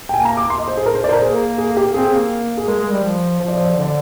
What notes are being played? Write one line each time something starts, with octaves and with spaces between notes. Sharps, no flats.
G5
A#3 G#5
A#5
D6
C6
D#5
C5
G#4
A#4
C5
D5
C5
A#4
A#3 G#4
G#4
G4
C4 G#4
A#3
G#4
G#3 A#4
G#3
G3
F3
F3 C5
D5
C5
D5
D3 C5
D5